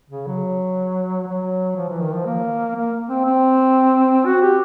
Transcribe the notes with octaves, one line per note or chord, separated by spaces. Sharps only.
C#3
F#3
F#3
F3
E3
D#3
F3
A#3
A#3
C4
C4
F#4
G4